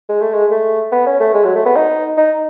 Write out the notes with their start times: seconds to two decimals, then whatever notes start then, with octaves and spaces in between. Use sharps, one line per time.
0.09 G#3
0.21 A3
0.34 G#3
0.51 A3
0.92 B3
1.06 C#4
1.20 A3
1.34 G#3
1.44 F#3
1.55 A3
1.65 B3
1.76 D#4
2.17 D#4